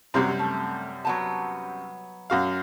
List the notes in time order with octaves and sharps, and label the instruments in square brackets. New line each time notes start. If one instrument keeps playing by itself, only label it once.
[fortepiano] F#2 C3 G3 [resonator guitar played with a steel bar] F#3 C4
[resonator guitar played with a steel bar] A3
F#3 B3 A5
[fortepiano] F#2 F#4 F5